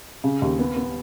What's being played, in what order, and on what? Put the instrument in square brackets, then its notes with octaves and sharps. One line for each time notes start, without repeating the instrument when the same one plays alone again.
[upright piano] C#3
D#2
B3
B3